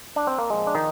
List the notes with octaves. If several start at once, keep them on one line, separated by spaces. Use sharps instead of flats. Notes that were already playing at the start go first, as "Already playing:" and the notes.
D4
C4
A#3
A#2 F3 G#3
D4
D#3 D#4